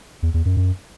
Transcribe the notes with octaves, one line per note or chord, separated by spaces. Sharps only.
E2
E2
F#2
F#2